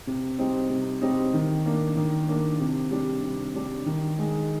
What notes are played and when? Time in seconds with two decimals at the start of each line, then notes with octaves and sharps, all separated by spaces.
0.07 C3
0.39 G3 C4 D#4
0.70 C3
1.01 G3 C4 D#4
1.34 D#3
1.65 A#3 D4
1.97 D#3
2.28 A#3 D4
2.60 C3
2.91 G3 D4
3.23 C3
3.55 G3 D4
3.86 D#3
4.19 G#3 D#4